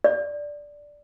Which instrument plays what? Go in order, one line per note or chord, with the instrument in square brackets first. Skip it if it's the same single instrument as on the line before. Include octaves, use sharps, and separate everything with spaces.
[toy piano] D5